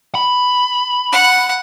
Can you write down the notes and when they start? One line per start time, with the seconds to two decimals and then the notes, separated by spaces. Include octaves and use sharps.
0.15 B5
1.12 F#5